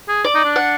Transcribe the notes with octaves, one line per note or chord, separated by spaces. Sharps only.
G#4
D5
D#4
D4
F#5